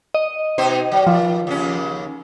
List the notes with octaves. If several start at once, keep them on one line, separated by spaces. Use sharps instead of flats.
D#5
B2 D#4 C5
F#3
D#3 F3
D#2 C#3 C#4